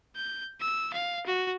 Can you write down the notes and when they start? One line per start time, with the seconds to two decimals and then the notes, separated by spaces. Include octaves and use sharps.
0.16 G6
0.60 E6
0.93 F5
1.26 F#4